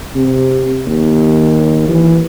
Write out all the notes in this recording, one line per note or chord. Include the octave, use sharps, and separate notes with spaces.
C3
D#2
E3